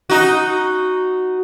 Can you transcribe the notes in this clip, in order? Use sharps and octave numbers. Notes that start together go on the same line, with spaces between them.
D#4 F#4